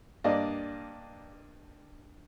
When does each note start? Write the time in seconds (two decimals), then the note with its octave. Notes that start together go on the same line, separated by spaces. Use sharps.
0.24 G2 A#3 D4 D5 D#5 F5